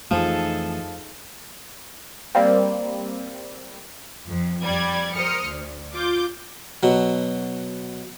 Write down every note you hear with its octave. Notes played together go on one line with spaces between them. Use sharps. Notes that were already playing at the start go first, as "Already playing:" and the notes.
F2 E3 F3 A3 D#4 G#4 A4
G3 A#3 C4
F2
F2 G3 D5 G#6
A#4 C5 D#6 F6 C#7
D2
F4 D6 G6
B2 F#3